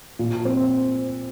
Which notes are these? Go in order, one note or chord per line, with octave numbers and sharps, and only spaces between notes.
A#2
C4